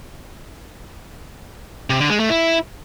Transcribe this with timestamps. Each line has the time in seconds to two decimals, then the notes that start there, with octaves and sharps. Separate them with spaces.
1.90 C3
2.00 D3
2.10 G#3
2.20 A3
2.30 E4